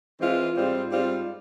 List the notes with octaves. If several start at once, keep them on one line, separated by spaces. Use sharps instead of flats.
E3 G#3 C4 F4
G#2 G3 C4 F4
G#2 G3 C4 F4